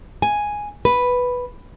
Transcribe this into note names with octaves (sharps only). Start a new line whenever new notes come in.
G#5
B4